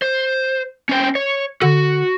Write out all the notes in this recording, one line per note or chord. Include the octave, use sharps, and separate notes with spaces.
C5
C#4 C5 G5
C#5
D3 F#4